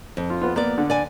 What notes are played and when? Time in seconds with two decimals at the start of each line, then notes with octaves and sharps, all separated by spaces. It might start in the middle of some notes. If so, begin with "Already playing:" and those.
0.17 F2
0.30 F4
0.42 B3 F4
0.56 A#3 B3 D5
0.78 D3
0.90 D5 G#5